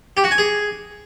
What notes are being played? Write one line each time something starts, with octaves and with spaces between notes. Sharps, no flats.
G4
F#4
G#5
G#4